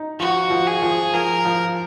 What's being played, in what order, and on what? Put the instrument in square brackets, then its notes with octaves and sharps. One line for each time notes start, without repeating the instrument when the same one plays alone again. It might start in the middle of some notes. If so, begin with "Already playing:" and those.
Already playing: [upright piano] D#4
[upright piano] F3 [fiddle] F#4
[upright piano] F3
[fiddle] G#4
[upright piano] F3
[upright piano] F3 [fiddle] A#4
[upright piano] F3